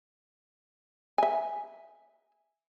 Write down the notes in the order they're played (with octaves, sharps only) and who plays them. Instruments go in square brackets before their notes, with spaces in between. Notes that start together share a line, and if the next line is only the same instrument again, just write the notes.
[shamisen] E5 G#5